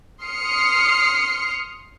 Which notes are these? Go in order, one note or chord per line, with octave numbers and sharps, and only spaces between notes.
C6 D#6 F6 C7 C#7